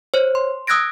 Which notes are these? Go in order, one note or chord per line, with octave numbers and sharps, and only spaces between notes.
C5 C#5
C6
D#6 E6 F#6 G#6 A#6 D7